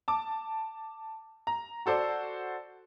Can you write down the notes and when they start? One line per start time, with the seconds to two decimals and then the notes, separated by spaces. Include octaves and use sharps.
0.08 A5 D6
1.47 A#5
1.86 F#4 A4 C5 D5